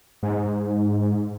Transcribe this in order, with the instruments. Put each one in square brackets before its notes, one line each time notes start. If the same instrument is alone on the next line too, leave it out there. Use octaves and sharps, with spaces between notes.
[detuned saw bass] G#2